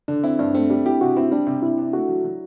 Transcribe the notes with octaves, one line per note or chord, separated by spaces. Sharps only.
D3 D4
C4 E4
G2 D4
A3 C4
G3 D4
E4 G4
C3 F#4
C4 E4
G3 D4
C3
C3 E4
D4
A3 F#4
F#3
F#3